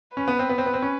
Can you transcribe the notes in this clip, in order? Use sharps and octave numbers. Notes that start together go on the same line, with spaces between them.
C#4 B4
B3
C4
B3
C4
B3
C4
C#4